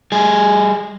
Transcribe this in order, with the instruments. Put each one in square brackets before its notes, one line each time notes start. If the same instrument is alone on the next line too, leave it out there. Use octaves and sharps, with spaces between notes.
[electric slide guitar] G3 G#4